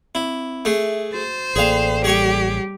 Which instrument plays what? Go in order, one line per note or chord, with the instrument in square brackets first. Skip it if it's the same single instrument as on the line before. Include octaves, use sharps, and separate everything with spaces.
[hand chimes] C4 [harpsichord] E4
[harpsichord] A3 G#4 [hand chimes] E5
[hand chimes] F#4 A6 [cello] C5
[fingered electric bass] A1 A#3 [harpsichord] G#4 F5 [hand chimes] A4 D5 G5
[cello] G3 G4 [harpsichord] G#4 C#5 G#5